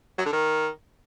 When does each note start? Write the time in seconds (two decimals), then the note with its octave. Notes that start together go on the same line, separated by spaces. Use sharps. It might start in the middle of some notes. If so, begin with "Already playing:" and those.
0.18 F#3
0.25 D3
0.33 D#3